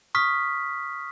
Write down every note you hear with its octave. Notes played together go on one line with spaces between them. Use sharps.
C#6 D#6 F6 B6